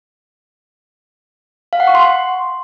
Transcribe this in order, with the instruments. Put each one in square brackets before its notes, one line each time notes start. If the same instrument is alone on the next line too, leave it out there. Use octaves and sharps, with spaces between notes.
[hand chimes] F5
F#5
C#6
C6